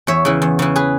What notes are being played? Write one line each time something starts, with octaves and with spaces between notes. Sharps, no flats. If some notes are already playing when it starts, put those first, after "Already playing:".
E2 C#5 E5
C#3 E3
E2
C#3 E3
G#4 B4